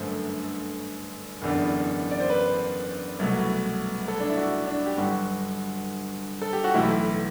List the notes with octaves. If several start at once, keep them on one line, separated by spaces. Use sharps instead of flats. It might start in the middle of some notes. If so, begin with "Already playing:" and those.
Already playing: G1 F#2 D3 A3 C5
F#1 E2 D3
D5
C5
B4
C2 B2 F#3 A3
A4
D4
E4
F#4
D4
G4
G1 G2 F#3 F#4
A4
G4
F#4
B1 A2 E3 A3 E4